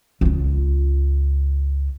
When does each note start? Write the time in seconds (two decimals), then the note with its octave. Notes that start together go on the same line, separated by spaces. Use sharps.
0.21 C#2 F4